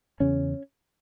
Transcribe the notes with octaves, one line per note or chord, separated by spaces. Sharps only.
E2 C#3 C#4